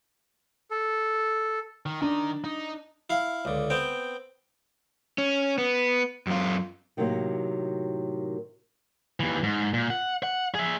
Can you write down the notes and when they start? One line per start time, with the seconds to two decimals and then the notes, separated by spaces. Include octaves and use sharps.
0.71 A4
1.86 D#3
2.02 D#3 D4 D#4
2.44 D#4
3.10 E4 F5
3.45 C#2 D3
3.70 B3 C4 G5
5.18 C#4
5.58 B3
6.27 F#2 F4
6.97 A2 C3 D#3 F#3 G3 A#3
9.20 D#2 E3
9.43 G#2
9.74 A#2
9.90 F#5
10.23 F#5
10.55 G#4 E5